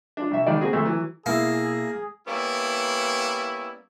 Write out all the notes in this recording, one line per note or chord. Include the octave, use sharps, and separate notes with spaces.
D4 F4
C2 E5
C#2 D#3 D5
A#3 C4 F#4 G#4
D2 F3 A3
E3 F#3
B2 A#3 E4 G#4 E6
G3 A#3 B3 C#4 E4